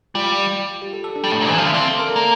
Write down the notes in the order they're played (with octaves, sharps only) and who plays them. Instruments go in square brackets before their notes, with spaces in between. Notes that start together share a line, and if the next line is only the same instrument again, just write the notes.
[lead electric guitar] G3 [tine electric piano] F4
[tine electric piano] G4
A4
A4
D4
[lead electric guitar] G3
A2
A#2
[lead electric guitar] E3 [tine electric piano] C5
[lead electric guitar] F3 [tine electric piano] F5
[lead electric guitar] D3 [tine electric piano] E5
[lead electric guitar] C4 [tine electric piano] D5
[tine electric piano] A4
A#4
[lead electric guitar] A#3